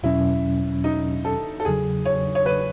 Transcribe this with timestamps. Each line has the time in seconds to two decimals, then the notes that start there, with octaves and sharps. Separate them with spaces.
0.03 E2 B2 F#3 C#4 E4
0.84 D#4
1.25 A4
1.60 A4
1.65 E2 C#3 F#3 G#4
2.05 C#5
2.35 C#5
2.46 B4